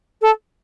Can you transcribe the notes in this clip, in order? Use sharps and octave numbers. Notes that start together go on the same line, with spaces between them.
A4